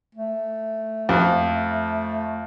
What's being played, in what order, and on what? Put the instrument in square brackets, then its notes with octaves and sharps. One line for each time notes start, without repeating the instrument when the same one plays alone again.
[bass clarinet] A3
[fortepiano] F2